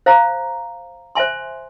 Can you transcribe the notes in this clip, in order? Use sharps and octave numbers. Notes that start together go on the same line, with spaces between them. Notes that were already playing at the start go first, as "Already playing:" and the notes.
C5 F5 A#5
C5 E5 G#5 C6